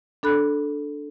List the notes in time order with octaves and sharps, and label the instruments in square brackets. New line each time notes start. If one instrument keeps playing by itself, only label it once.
[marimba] D4 A4 B5 F#6